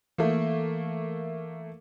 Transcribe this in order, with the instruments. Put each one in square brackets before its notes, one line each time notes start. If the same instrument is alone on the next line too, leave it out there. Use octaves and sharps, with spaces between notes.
[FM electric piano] E3 [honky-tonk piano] A3 A#3